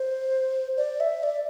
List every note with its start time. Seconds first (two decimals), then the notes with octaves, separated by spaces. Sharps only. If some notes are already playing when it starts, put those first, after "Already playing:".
Already playing: C5
0.77 D5
1.00 E5
1.23 D5